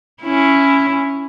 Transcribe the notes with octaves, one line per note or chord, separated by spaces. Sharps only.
C#4 E4